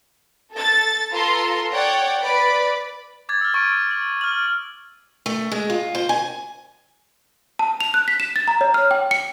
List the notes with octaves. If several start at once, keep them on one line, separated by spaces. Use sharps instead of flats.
A4 A6
F4 A4 B4 A#5 C6
C#5 D5 F#5 G5
B4 D5 B5
D6 G#6 A6
E6 F6
C#6 A6 D7 D#7
F#7
F6 F#7
A3
G#3
F4
C5
G#5
A5
F7
F#6
B6
E7
A6
A#5
C#5
F6
G5
C#7